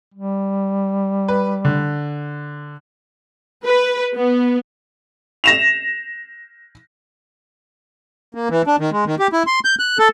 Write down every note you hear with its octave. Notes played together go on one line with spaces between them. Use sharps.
G3
B4
D3
B4
B3
A#6 E7 F7
A#3
E3
D4
D#3
G#3
D#3
G4
E4
C6
G6
F#6
A4